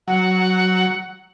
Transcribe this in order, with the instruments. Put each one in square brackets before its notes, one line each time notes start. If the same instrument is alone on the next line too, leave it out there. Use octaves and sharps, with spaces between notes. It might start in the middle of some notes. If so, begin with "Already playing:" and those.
[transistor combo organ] F#3 [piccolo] F#5